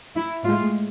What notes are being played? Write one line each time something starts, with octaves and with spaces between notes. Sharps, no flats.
E4
A2 G#3 F4